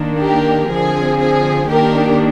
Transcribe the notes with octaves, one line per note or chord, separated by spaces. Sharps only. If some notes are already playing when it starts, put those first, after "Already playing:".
Already playing: D#3 A#3 D4
G4 A#4
D3 F3 C4 G#4
G#4
D#3 A#3 D4 G4 A#4